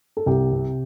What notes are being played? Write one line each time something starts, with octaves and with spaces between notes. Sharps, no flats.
A4
C2 G4
C3